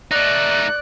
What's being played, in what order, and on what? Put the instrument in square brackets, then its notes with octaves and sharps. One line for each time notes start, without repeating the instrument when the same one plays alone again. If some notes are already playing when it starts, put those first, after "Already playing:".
[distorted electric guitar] A3 D#4 [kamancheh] D5 [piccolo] F#6